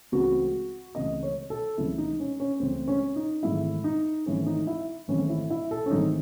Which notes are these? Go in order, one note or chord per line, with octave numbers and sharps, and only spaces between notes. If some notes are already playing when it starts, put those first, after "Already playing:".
C#2 C#3 E3 A3 C4 F#4
C#2 C#3 E3 A3 C4 D#5
C#5
A4
C#2 C#3 E3 A3 C4 E4
D#4
C#4
C#4
C#2 C#3 E3 A3 C4
C#4
D#4
G#1 G#2 E3 A3 C4 E4
D#4
G#1 G#2 E3 A3 C4 C#4
D#4
E4
G#1 G#2 E3 A3 C4 C#4
E4
E4
A4
C#4
G#1 G#2 E3 A3 C4 D#4